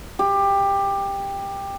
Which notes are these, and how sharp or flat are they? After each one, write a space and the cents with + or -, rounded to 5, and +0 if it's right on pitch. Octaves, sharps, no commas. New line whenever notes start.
G4 +15